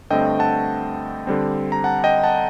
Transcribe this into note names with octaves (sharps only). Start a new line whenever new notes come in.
G2 D3 A3 C4 D#5 G5
F#5 A5
D3 G3 C4
A#5
F#5 A5
D#5 G5
F#5 A5